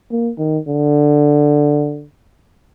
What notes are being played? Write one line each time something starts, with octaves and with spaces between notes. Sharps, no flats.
A#3
D#3
D3